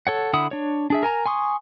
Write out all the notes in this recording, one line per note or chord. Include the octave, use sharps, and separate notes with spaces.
A4 C#5 F#5
D3 E4 F#5 B5 D#6
D4 C#5
D4 G#4 E5
A#4 G#5 A#5
G#5 C6 C#6 D#6